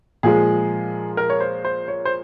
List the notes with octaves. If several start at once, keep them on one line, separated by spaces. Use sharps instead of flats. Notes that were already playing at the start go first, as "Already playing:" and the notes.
A#2 F3 G#3 G#4
A#4
C#5
C5
C5
C#5
C5